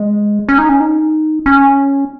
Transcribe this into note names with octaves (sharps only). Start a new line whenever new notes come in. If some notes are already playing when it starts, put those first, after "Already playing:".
Already playing: G#3
C#4
D#4
C#4
D#4
C#4